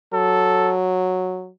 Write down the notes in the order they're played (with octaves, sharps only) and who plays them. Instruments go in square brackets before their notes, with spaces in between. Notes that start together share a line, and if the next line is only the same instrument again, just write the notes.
[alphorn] F#3 [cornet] A4